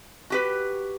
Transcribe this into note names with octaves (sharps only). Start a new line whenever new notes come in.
F#4 G4 B4